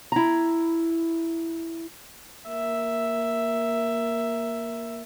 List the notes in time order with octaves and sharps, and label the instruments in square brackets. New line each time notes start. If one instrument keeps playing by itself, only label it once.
[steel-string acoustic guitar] E4 A#5
[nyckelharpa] A#3 E5